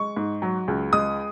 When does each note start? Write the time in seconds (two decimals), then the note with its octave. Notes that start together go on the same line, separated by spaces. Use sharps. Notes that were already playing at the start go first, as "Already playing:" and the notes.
Already playing: G#3 C#6
0.17 G#2
0.42 F#3
0.68 C#2
0.93 G#3 D#6